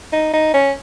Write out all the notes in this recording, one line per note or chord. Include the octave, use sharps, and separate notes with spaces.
D#4
D#4
C#4